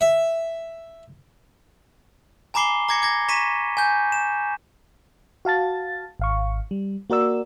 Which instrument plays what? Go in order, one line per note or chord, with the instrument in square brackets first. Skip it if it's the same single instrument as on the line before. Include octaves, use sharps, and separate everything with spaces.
[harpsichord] E5
[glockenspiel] G#5 A#5 B5 D6 C7 G7
A#5 D6 G#6 A#6 C#7
D6 G#6 A#6
A#5 C#6 A#6 B6 D#7 E7
G#5 G6
E7
[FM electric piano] F#4 F5 A5 A6
G#1 F5 C#6
G3
A#3 F#4 A#4 D5 E6